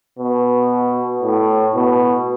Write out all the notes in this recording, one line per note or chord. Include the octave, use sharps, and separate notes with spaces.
B2
A2
B2